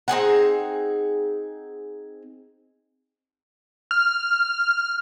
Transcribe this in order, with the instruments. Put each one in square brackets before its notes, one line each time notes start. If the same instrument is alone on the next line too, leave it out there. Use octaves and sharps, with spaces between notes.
[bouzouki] C4 D#4 G#4 F#5
[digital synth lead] F6